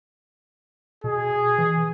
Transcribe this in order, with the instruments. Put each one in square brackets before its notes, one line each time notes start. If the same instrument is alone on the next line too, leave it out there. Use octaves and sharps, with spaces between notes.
[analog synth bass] B2 [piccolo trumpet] G#4
[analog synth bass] E3